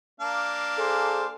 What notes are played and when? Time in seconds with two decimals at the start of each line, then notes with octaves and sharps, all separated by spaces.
0.20 A#3 D4 F5
0.77 G#4 A4 C5